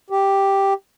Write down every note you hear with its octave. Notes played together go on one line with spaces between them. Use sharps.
G4